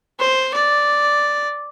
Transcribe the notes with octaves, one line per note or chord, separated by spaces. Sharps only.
C5
D5